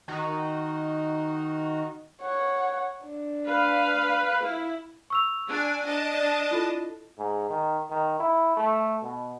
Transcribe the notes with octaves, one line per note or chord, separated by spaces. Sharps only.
D#3 D#4 F#4
C#5 F#5
D4
B4 F5
E4
C#6 E6 F7
D4 G#5
D4 D#5 A5
D5
E4 F4 A4
G#2
D#3
D#3
E4
A3
B2